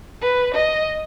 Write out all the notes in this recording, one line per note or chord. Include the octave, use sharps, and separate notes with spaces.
B4
D#5